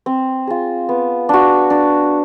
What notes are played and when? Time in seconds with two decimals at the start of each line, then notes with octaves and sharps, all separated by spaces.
0.06 C4
0.47 F4 G#4
0.89 B3
1.29 D4 F#4
1.70 D4